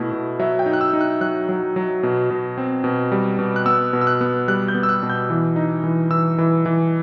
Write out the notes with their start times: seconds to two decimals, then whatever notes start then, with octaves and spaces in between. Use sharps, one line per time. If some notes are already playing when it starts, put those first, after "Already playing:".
Already playing: B2 A3 E4
0.12 B2
0.39 F#3 E5
0.59 G5
0.66 D#4
0.73 F#6
0.81 E6
0.93 D#4
1.01 F#6
1.21 F#3 F#6
1.49 F#3
1.76 F#3
2.03 B2
2.31 B2
2.58 C4
2.84 B2
3.12 G3
3.39 B2
3.56 F#6
3.66 B3 E6
3.93 B2
4.01 E6
4.07 F#6
4.21 B3
4.48 G3 F#6
4.68 G6
4.75 B3
4.83 E6
4.89 F#6
5.03 B2
5.10 G6
5.30 E3
5.56 D#4
5.84 E3
6.10 E3 E6
6.38 E3
6.66 E3